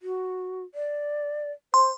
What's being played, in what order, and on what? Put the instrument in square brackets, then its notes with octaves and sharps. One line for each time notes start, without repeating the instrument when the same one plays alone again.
[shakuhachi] F#4
D5
[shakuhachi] C5 [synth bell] C6